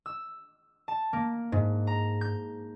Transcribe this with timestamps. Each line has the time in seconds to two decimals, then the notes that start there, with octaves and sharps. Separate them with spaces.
0.06 E6
0.88 A5
1.13 A#3
1.52 G#2
1.87 A#5
2.21 G6